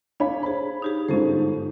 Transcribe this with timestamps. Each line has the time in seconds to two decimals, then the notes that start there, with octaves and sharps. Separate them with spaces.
0.20 D4 C#5 F5 B5
0.43 G#4 C5 B5
0.82 D#4 G4 G#4
1.09 G1 G#2 C#4 A4 C5